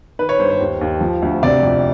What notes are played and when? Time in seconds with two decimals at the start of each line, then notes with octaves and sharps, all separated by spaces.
0.19 D#3 B4
0.29 C#5
0.39 G2 C5
0.49 C5
0.60 D#2
0.81 D#2
1.01 F3
1.22 D2
1.43 C3 D5
1.63 F2